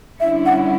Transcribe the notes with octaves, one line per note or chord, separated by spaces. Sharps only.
D3 G3 C#4 E4 E5
F#5